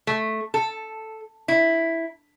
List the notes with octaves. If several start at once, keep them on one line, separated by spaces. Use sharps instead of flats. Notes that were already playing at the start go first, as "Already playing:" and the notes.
A3
A4
E4